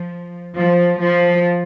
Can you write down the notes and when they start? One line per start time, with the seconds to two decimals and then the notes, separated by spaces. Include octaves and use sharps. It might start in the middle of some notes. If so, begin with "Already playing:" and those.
Already playing: F3
0.58 F3
1.01 F3